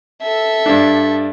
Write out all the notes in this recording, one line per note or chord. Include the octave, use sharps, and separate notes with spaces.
A4 E5
G2 D4